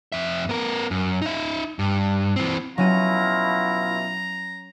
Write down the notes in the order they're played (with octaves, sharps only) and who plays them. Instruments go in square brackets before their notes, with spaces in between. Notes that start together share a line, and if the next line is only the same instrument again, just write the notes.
[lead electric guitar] F2 E5
B3 A#4
F#2
D#4 E5
G2
E3 C4
[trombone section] B2 E4 F4 [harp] F#3 C#4 D#7 [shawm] A#5